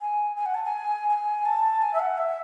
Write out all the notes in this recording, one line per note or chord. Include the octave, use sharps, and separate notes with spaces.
G#5
G#5
F#5
A5
G#5
G#5
A5
G#5
E5
F#5
E5